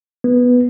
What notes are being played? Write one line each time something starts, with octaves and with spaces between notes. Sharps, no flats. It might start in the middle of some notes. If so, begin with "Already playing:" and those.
B3